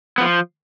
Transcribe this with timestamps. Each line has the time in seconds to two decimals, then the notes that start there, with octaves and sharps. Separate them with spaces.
0.18 B3
0.20 F3